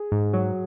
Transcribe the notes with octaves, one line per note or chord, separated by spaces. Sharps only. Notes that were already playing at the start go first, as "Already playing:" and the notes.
Already playing: G#4
G#2
F#3